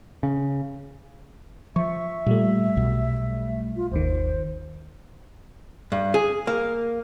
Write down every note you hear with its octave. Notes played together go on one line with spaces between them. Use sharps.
C#3
F3 E5 C#6
A#2 G3 A3
B1 B2
F4
G1 D#2 D#3 C5
G2
G#4
A#3